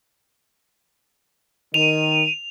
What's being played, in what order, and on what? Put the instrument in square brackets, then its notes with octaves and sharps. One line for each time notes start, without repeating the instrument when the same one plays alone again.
[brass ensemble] D#3 [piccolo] D#7 [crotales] F7